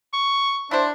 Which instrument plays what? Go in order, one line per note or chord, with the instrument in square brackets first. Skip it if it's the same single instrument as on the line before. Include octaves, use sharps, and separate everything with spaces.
[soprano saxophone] C#6
[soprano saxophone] D4 [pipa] E4 G4 C5